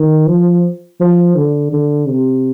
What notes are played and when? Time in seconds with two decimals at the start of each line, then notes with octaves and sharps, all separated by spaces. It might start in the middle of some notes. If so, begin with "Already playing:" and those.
Already playing: D#3
0.27 F3
1.01 F3
1.36 D3
1.73 D3
2.08 C3